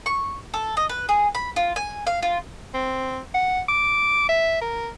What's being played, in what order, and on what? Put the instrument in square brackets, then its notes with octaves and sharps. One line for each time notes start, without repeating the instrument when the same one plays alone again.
[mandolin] C#6
A4
D#5
B4
G#4
B5
F4
G#5
F5
F4
[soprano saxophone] C4
F#5
D6
E5
A#4